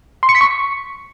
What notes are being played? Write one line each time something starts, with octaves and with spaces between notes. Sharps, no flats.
C6
C#7
B6
C#6